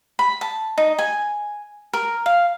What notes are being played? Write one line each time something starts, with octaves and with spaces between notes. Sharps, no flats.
B5
A5
D#4
G#5
A#4
F5